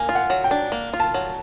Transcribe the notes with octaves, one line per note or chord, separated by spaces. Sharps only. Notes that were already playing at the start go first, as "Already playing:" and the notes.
Already playing: A#3 G#5
F4
F#5
F#3
G5
D4
A#3
F4
A5
F#3